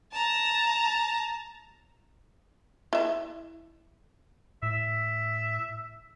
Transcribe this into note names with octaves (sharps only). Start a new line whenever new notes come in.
A5 A#5
E4 E5
A2 E5